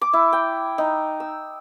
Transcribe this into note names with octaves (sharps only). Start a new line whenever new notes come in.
D6
E4
G5
D#4
E6